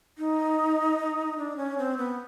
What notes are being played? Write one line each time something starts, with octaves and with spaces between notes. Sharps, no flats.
D#4
D4
C#4
C4
B3